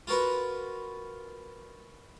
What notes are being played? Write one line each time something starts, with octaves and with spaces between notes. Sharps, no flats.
F4 F#4 A#4 B4